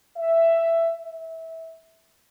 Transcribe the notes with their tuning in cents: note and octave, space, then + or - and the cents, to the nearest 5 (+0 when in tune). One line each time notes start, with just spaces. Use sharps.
E5 +10
E5 -20